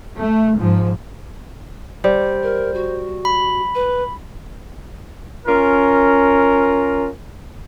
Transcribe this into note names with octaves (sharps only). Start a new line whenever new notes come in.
A3
G#2 F3
G3 C5
A#4
F#4
B5
B4
C#4 F4 A#4